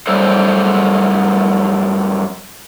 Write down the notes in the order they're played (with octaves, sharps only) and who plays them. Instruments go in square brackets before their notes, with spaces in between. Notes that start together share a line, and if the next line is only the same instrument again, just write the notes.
[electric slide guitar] F#2 G3 A3 A4 C5